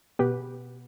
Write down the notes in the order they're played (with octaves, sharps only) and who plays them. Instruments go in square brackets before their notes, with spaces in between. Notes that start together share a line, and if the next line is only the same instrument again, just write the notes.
[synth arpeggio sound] B2 B3 G4 B4